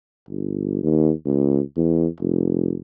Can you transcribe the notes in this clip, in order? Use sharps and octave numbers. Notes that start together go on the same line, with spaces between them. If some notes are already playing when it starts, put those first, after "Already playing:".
G1
D#2
C#2
E2
F1